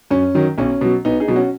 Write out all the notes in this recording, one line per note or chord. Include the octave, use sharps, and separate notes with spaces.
F#2 C#4
D#3 F#3
B1 C#4
B2 F#3
B1 B3 D#4
D#4 G#4
B2 F#3
C#4 F#4